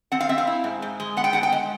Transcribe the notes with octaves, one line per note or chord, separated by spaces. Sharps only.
C4 F#5
F5
C4 E5
F5
E4
G#2
G#2
G#3
B3 F#5
G5
G#2 F#5
G5
G#3